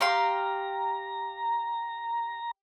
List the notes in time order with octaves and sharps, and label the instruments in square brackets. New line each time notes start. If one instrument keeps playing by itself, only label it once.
[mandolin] G4 F5 C6 [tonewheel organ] A#5